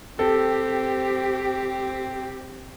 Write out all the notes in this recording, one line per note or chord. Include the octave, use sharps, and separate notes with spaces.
C4 G4 A4